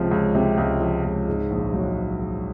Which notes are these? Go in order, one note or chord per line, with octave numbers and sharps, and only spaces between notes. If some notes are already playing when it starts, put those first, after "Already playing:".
Already playing: C#2 C3 F3
C#2
C3
C#2
F3
C#2
G#2
A#1
F#3